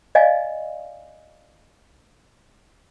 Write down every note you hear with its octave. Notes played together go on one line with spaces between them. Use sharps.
D5 D#5 F5 G#5